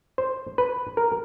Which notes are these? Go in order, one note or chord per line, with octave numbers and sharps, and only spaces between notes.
C5
B4
A#4